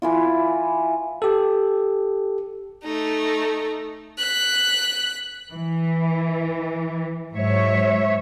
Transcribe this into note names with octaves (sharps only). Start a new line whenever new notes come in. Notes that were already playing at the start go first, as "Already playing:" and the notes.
E3 E4 F4
G4 A4
A3 D#4
F#6 B6
E3
G#2 F#3 C#5 E5